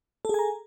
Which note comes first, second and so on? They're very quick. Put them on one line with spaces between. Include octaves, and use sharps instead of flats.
A4 G#4 G#5 A#5